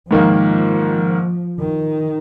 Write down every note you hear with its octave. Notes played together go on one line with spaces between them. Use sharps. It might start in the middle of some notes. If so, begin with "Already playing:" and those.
G#2 D#3 F3 A#3
D#3